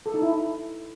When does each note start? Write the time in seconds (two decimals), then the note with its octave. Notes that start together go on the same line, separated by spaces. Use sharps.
0.06 A4
0.14 D#4
0.22 E4